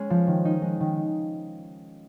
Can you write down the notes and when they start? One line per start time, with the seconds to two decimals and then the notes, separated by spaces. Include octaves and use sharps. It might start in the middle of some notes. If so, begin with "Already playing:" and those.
Already playing: G#3 C#4
0.10 F3
0.27 D#3
0.45 D#4
0.62 G#3
0.80 D#3